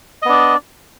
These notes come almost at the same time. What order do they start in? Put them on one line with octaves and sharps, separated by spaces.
D#5 B3 D4 D5